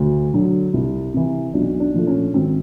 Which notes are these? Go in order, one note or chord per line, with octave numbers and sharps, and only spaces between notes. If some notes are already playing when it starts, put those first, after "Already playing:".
Already playing: D2
D3 F#3
C2
C3 E3
B1 D4
D4
A#2 F3 A3
C#4
G#1 C4